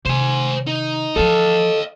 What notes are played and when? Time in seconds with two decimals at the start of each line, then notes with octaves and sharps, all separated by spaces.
0.06 C3 D#3 C5 G#5
0.67 D#4
1.16 E3 F3 A4 D#5 F5